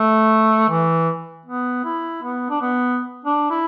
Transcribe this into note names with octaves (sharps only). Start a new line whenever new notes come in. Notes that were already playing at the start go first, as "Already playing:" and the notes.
Already playing: A3
E3
B3
E4
B3
D4
B3
D4
E4